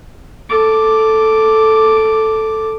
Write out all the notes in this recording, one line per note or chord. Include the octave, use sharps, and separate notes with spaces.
A4 D6